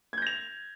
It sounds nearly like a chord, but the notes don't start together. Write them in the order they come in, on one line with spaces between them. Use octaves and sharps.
G#6 G6 A#6 F7